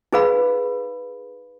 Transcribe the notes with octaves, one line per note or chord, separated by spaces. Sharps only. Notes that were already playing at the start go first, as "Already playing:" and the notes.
D#4 G#4 B4 F5 B5